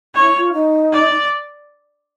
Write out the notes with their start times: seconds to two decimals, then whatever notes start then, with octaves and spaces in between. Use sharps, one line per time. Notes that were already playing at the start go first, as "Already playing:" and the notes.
0.15 E4 C#5
0.35 F4
0.53 D#4
0.92 D5